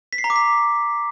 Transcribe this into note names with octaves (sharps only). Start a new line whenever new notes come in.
B6
C7
A#5
D6
B6